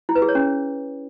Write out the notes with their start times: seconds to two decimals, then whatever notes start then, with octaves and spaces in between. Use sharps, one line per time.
0.09 E4
0.15 B4
0.22 G#4
0.29 C#5
0.35 C#4